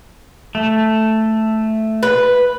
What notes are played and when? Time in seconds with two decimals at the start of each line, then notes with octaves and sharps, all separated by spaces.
0.55 A3
2.03 B4